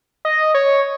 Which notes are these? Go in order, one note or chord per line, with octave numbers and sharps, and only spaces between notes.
D#5
C#5